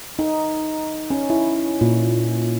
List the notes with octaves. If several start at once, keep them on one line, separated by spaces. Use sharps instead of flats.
D#4
C#4
E4
A#2